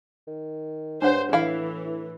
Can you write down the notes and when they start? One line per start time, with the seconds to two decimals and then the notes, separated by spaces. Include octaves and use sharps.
0.27 D#3
1.02 G2 D4 C5 C#5 F#5
1.33 A2 E3 E4 F5